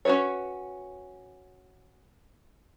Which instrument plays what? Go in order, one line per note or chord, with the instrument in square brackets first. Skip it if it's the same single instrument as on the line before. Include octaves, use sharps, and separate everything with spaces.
[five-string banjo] C#4 F#4 G#4 B4 C#5